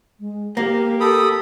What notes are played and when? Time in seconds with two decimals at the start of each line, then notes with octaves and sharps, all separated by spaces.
0.20 G#3
0.57 A#3 G4 A#4
1.01 A4 A#4 B5 D#6